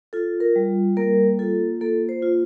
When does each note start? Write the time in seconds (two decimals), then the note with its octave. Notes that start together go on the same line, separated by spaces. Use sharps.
0.13 F4 A4
0.40 A#4
0.56 G3
0.97 A#3 A#4
1.39 F4 A4
1.81 A#3 A4
2.09 C5
2.23 F4